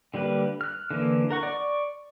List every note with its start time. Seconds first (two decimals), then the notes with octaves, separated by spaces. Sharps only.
0.14 D3 G3 A#3 B4
0.61 F6 F#6
0.90 D3 E3 A#3
1.31 A#4 F#5 C#6
1.43 D5 C#6